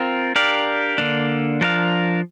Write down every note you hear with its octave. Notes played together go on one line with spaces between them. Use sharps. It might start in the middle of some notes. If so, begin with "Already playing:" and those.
Already playing: C4 F4 A#4
D4 G4 A#4 D5 F5
D3 A#3 D4
F3 D4 A#4 F5